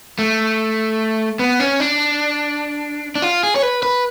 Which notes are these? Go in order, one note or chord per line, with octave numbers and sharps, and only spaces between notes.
A3
B3
C#4
D4
D4
F4
G#4
C#5
B4
B4